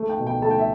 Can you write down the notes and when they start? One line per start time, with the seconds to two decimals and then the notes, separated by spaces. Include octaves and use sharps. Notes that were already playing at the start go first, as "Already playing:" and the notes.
Already playing: A3
0.09 G5
0.18 B2
0.27 G5
0.42 A3 A5
0.51 G5
0.59 E5